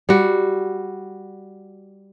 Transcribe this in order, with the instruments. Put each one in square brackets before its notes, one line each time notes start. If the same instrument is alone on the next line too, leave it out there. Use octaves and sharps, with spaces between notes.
[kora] G3 F#4